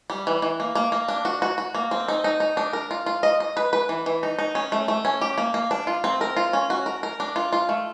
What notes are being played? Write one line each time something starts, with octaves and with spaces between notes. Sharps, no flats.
G3
E3
E3
A#3
A#3
A#3
D4
F#4
F#4
F#4
A#3
C4
D#4
D#4
D#4
D4
A#4
F4
F4
D#5
D#5
B4
B4
E3
E3
D#4
D#4
C#4
A3
A3
C#4
G4
A#3
A#3
D4
F4
C4
A#4
F4
C#4
F#4
A#4
A#4
D4
F4
F4
A3